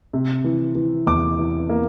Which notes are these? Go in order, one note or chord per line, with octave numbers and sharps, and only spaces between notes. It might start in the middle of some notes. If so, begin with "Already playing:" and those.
C3
E3
E3
E2 D6
E3
A#3